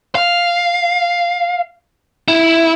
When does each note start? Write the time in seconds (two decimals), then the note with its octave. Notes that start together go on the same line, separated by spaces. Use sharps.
0.15 F5
2.28 E4